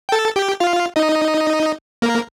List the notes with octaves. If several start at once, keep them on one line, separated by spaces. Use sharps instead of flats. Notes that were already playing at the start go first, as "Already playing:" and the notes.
G5
A4 A5
G4 G5
F4 F5
D#4 D#5
A#3 A#4